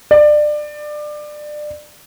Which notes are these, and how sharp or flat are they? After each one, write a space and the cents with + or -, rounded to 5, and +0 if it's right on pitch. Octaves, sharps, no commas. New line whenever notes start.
D5 +25